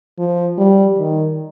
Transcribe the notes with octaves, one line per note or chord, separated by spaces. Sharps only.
F3
G3
D#3